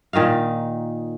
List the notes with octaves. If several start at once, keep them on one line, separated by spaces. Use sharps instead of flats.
A#2 D#3 D#4 F5